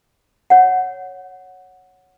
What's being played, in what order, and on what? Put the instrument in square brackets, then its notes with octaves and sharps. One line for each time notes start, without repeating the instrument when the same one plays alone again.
[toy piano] C#5 F#5